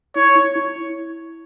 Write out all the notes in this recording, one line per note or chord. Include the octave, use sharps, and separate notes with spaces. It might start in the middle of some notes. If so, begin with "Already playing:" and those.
E4 C#5
E4
E4